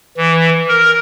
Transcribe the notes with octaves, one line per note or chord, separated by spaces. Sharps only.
E3
A#4